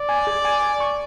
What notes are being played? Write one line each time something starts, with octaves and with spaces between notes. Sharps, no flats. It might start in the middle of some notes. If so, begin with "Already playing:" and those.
Already playing: D5
G#5
G#4
G#5
G#5
C#6